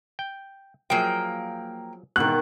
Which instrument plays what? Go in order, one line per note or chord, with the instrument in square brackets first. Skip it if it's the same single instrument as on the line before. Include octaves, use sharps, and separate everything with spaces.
[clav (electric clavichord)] G5
[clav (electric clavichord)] F3 F#3 G#4 [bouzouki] A#3 G5
[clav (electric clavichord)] G#2 E3 [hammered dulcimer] B2 D#3 [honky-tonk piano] F#6